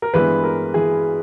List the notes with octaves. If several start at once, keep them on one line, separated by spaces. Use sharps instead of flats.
A#4
G2 E3 G#3 B3 B4
A#4
E3 G#4